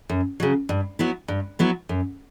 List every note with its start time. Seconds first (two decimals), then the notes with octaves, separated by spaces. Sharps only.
0.09 F#2
0.40 C#3 F#3
0.69 G2
0.99 F#3 B3 E4
1.28 G2
1.59 F#3 B3 E4
1.89 F#2